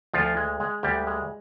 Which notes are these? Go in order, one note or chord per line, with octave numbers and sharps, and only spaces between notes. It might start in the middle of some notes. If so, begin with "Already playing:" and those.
D2 F3 F4
G#3
G#3
D2 G3 G4
G#3